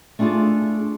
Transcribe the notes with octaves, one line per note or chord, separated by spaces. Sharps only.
A3 D4 E4 F4 G#4